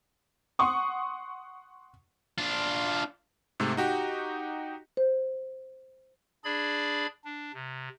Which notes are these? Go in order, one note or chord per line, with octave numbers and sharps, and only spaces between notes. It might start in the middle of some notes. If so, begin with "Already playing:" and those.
F#5 C6 C#6 D#6
D4 F4
G#2 C3 A3
D#4 F#4 G4
C5
D4 G#4 D5 B5 G#6
D4
C3